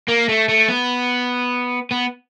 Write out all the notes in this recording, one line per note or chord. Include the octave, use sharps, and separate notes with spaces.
A#3
A3
A3
B3
B3